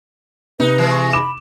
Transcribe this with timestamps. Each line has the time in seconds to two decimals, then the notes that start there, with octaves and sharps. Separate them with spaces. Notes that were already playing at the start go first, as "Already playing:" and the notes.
0.60 C3 D#4 B4
0.78 E3 G#3
0.90 C#6
1.13 B5 D6 E7